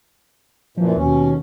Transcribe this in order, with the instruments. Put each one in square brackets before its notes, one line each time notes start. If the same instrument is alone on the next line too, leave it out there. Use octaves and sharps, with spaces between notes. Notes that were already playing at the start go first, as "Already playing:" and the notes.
[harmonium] F#2 A#2 E3 [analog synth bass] F3
[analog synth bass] D#2 [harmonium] B2 C#4